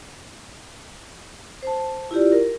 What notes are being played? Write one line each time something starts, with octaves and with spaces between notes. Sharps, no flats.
C5 A5
E4 F4 G4 D5
A#4